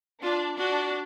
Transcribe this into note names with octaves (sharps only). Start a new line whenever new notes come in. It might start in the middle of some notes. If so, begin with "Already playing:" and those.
D4 F4
D4 F#4